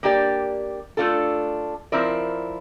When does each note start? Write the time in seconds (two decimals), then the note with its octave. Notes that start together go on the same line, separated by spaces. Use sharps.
0.03 A#3 D4 G4 D5
0.97 A3 D4 F4 A4
1.92 F3 C4 E4 A#4 D5